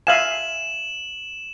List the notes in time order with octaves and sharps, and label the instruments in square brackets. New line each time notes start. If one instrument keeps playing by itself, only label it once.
[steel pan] E5 F5 G#5 [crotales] E7 F#7